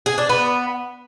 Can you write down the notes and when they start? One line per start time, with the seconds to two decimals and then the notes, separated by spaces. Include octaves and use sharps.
0.06 G#4
0.18 D4
0.29 B3